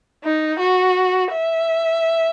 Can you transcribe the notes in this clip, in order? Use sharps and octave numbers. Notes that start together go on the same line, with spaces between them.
D#4
F#4
E5